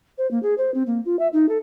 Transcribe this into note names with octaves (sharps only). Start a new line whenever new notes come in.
C5
A#3
G#4
C5
C4
A#3
F4
E5
D#4
A4